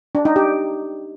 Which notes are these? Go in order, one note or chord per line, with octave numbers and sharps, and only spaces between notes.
D4
D#4
G4